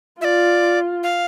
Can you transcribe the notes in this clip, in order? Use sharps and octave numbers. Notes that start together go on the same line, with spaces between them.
F4 D5 E5
F5